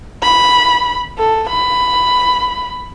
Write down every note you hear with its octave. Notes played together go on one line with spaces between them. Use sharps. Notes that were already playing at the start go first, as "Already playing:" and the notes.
B5
A4
B5